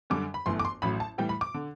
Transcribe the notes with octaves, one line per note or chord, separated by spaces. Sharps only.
F#2 D3 G3 D6
B5
G1 F#2 E3 A3 C6
D6
C6
A1 A2 F#3 B5
A5
A2 E3 G3 G5
B5
D6
D3